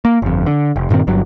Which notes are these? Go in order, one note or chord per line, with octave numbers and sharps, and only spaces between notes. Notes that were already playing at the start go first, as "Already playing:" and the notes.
A#3
G1 F2
D3
F1
G2 A#2 D#3 C4
G1 G2 F#3